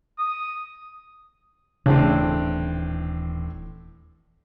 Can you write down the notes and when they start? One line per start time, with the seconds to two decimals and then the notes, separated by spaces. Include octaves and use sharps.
0.18 D#6
1.86 D#1 A2 C#3 E3 C4 D4